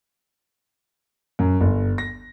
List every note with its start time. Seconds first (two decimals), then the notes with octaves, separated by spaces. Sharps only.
1.39 F#2
1.61 G1
1.98 A#6